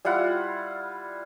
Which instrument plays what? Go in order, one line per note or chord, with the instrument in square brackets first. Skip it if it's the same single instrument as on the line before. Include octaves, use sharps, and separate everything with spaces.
[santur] G3 E4 F4 F#5